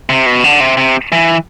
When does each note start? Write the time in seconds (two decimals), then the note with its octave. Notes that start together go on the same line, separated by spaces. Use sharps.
0.09 C3
0.26 B2
0.44 D3
0.60 C3
0.77 C3
1.12 E3